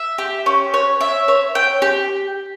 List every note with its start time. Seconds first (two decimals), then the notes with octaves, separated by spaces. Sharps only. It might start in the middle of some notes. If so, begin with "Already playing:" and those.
Already playing: E5
0.18 G4
0.46 C#4
0.74 C#5
1.01 E5
1.28 C#5
1.55 G5
1.82 G4